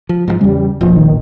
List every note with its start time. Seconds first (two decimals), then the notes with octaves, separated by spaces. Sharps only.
0.09 F3
0.28 G#2 C#3 F3
0.41 E2 C#3 G3
0.81 E1 A1 A#2 F3
0.97 D#3